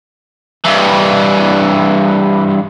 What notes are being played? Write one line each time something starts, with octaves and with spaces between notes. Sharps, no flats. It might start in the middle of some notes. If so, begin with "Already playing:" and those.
G2 E3